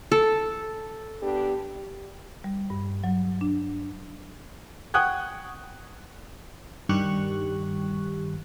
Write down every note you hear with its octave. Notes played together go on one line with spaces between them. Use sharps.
A4
B3 D4 G4
G3
G2
F#3
D4
F#5 G5 C#6 D#6 F#6 G#6
G2 D#3 G3 G4 C#6 F#6